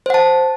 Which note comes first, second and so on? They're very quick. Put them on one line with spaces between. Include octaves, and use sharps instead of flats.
C5 F#5 A5